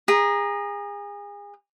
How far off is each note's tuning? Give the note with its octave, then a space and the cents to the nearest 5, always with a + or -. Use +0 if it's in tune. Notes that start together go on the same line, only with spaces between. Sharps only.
G#4 -30 A#5 +10